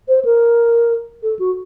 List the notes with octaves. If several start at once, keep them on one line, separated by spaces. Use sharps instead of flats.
C5
A#4
A4
F#4